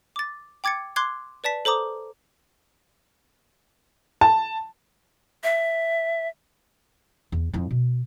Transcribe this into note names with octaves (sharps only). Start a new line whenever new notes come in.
D6 A6
G5 D6 G#6 A6 C#7
C6 D6 F#6 G#6 C7
B4 D5 A5 B6
A4 C5 A#5 D6 D#6
A5
E5
E2
F2 E4
B2